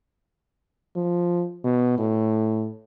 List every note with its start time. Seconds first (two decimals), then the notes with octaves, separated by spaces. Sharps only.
0.96 F3
1.65 B2
1.98 A2